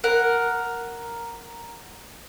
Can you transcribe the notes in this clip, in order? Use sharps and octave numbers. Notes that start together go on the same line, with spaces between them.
A#4 F#5